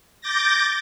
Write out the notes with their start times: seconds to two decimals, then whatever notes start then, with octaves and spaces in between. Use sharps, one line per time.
0.21 D6 G6 A6 A#6